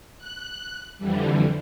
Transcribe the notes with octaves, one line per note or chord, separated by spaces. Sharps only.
F#6
F2 D3 E3 G3